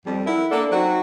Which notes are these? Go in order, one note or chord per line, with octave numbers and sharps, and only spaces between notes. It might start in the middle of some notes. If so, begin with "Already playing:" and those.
F2 G3
E4 A#4 E5 F#5
A#3 D4 A4
F#3 C4 D#4 F#4